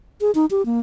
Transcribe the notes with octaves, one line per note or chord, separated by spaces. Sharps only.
G#4
D#4
G4
A#3